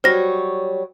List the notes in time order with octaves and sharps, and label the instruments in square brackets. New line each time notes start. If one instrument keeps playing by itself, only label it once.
[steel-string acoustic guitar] F#3 G3 C#5 [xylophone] C5 A#6